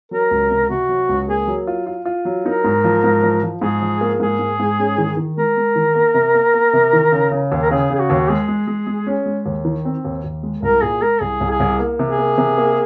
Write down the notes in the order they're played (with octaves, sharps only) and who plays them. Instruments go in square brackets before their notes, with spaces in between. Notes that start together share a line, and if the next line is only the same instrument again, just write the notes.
[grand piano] F#3 [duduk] A#4
[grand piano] C#2
C3
[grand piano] C3 [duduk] F#4
[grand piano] F#3
C#2
[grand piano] A#3 [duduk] G#4
[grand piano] F#3
F4
F4
F4
F#3
[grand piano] D#4 [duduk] A#4
[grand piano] G#2
F3
G#2
F3
F3
[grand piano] G#2 [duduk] G#4
[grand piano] F3
A#3
[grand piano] G#2 [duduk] G#4
[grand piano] G#2
G#2
C#4
D#3
D#3
[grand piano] G#3 [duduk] A#4
[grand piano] G#3
D#3
A#3
C3
A#3
A#3
C3
D#3
C#3
C#3
D#2
[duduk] A#4
[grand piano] C#3 [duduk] G#4
[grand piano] C#3 [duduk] G#4
[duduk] F#4
[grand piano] D#2
[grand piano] G#3 [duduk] G#4
[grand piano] G#3
G#3
G#3
C#4
G#3
D#2
D#3
C4
D#2
D#2
G#3
[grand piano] C2 [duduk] A#4
[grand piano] A#2 [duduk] G#4
[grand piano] G#3 [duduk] A#4
[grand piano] C2 [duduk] G#4
[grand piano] C2
[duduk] G#4
[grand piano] C2
A#3
C3
[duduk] G#4
[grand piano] A#3
C3
A#3